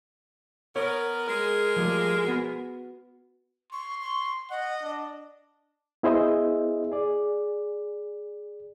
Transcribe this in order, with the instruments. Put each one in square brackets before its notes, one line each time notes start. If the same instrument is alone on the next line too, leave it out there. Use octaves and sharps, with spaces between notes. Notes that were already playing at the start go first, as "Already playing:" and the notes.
[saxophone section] B3 A#4 [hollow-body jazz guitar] C#5
[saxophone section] G#3 G#4 A#4
[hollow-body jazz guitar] F3 G3 A3
B3 F#4
[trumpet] C6 [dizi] C#6
[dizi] C#6
[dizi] D#5 [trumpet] F#5
[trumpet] D4
[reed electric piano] B3 E4 G#4 C5 D#5 E5
G#4 D5